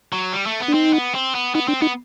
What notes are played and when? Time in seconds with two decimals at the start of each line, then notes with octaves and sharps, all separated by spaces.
0.13 F#3
0.33 G3
0.46 A3
0.60 B3
0.68 D4
0.74 C4 D#4
0.93 B3
1.15 C4
1.35 B3
1.55 B3 D#4
1.68 C4 D4
1.82 B3 D#4